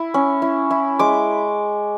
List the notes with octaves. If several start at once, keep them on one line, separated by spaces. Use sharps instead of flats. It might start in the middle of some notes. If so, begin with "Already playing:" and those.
Already playing: E4
C#4
E4
E4
G#3 D6